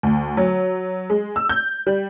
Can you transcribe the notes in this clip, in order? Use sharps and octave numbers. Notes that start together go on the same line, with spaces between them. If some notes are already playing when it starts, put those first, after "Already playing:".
D2
F#3
G#3
E6
G6
G3